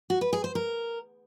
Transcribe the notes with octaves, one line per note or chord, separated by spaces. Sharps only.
F#4
B4
G#4
C5
A#4